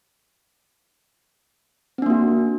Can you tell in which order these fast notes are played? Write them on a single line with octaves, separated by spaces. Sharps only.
C4 D4 A#3 F#4